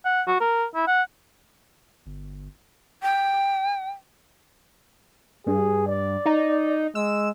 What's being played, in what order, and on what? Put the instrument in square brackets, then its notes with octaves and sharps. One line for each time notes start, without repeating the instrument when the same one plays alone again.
[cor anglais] F#5
F#4
A#4
E4
F#5
[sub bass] G1
[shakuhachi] G5
[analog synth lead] G2 [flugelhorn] G#4
[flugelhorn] D5
[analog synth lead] D#4
[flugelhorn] G#3 [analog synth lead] E6